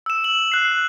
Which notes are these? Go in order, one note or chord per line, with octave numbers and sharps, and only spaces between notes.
E6 E7
F#7
F#6 C7